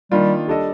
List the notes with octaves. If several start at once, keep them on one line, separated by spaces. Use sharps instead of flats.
D#3 G3 A#3 D4 F4
G3 D4 A4 D#5